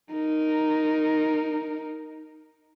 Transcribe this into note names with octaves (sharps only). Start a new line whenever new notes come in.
D#4 A#4